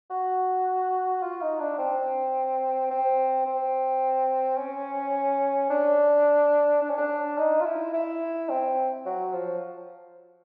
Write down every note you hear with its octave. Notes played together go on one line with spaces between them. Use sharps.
F#4
F4
D#4
D4
C4
C4
C4
C#4
D4
D4
C#4
D4
D#4
F4
E4
E4
C4
F#3
F3